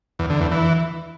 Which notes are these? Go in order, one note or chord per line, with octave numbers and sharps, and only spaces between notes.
E2
D3
E2
E3